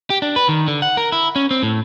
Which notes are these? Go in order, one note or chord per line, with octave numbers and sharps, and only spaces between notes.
G4
D4
B4
D#3
D3
F#5
A#4
E4
C#4
C4
A2